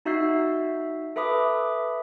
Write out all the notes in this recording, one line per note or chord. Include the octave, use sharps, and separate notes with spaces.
D#4 F#4 E5 E6 G6 C7
A4 B4 E5 B5 D6 D#6